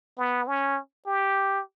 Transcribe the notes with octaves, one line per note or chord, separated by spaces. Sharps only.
B3
C#4
G4